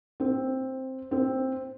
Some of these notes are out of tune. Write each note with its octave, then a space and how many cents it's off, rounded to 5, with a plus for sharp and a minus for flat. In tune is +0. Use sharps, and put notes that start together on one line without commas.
C4 +5
C4 +5